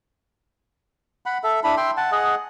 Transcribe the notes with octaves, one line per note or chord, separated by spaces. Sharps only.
F#5 B5
A4 E5
D4 E4 B5
E5 G5 C6
F#5 A5
G#4 D#5 F#5